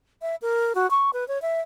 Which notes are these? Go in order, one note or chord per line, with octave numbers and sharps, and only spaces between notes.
E5
A#4
F#4
C#6
B4
C#5
E5